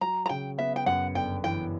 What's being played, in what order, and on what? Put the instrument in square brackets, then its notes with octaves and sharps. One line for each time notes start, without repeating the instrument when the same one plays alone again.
[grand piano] F#3 [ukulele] A#5
[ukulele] A#5
[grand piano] C#3 [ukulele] G5
[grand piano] B3 [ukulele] E5
[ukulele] G5
[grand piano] F#2 [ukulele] F#5
[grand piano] G1 [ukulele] G5
[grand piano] E3 [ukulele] G5